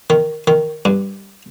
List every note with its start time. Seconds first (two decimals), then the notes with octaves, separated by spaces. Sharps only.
0.10 D#3
0.47 D#3
0.85 G2